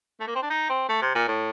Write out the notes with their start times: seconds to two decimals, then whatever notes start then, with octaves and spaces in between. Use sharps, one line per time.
0.21 A3
0.27 A#3
0.35 C4
0.43 D4
0.50 D#4
0.69 C4
0.89 A3
1.02 C3
1.15 A#2
1.28 A2